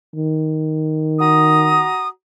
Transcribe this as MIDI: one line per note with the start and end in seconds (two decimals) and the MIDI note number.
0.16 1.89 51
1.20 2.08 66
1.20 2.08 82
1.20 2.08 87